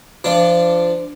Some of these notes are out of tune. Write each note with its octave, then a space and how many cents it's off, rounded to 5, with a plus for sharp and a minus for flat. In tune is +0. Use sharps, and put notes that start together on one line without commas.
F3 -25 D4 +0